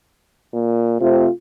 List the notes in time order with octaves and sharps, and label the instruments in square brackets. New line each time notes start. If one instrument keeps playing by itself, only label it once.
[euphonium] A#2
[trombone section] C3 A3 C4 [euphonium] F4